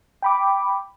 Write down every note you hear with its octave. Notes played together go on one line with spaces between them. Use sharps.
G5 B5 D6